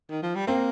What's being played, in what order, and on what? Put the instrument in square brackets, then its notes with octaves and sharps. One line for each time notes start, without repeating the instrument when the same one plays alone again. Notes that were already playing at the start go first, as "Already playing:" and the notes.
[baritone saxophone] D#3
F3
G3
[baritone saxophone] A#3 [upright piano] C4